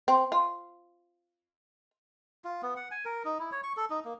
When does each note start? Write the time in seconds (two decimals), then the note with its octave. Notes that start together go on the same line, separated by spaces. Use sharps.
0.08 C4
0.32 F4
2.44 F4
2.63 B3
2.76 F#5
2.91 G#5
3.05 A#4
3.25 D#4
3.39 E4
3.52 C#5
3.63 C#6
3.77 A4
3.90 D#4
4.05 A#3